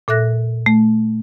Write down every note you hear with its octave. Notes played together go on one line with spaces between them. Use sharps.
A#2 A4 E5 F#6 A#6
A3